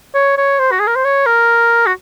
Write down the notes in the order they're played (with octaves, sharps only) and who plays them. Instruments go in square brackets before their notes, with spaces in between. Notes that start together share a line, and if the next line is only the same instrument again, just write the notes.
[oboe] C#5
C#5
C5
F#4
G#4
A#4
C5
C#5
A#4
F#4